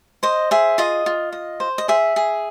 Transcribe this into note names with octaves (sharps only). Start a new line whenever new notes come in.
C5 D#5
G#4 E5
F4 D#5
F4
D#5
C5
D#5
G#4 E5
G#4